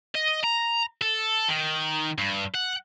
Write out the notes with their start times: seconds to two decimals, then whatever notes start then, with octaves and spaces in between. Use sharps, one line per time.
0.15 D#5
0.44 A#5
1.01 A4
1.48 D#3
2.18 G2
2.55 F#5